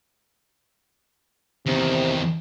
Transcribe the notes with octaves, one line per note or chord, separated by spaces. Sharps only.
E2 C3 D#3